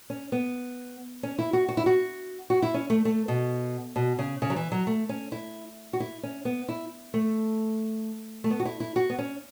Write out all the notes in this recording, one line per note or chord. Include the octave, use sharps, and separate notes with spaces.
C#4
B3
C#4
E4
F#4
F#4
E4
F#4
F#4
E4
C#4
A3
A3
B2
B2
C#3
C#3
F#3
E3
F#3
A3
C#4
E4
F#4
E4
C#4
B3
E4
A3
A3
B3
F#4
E4
E4
F#4
B3
C#4